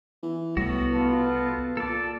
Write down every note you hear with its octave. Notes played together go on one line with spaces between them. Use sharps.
E3
C2 A2 B3 F#4
B2 F4 A4 B4
A#2 A4 D5